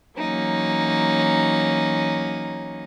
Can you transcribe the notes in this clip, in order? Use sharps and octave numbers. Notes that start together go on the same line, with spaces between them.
E3 F#3 A#3 C#4 D#4